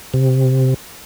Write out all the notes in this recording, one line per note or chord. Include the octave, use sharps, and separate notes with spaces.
C3